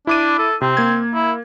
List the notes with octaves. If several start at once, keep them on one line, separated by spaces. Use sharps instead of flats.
D4 E4 D6 D#7
A4
C3 C4
A#3 G#6
E4